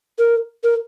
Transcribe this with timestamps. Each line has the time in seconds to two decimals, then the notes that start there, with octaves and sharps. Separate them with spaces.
0.19 A#4
0.64 A#4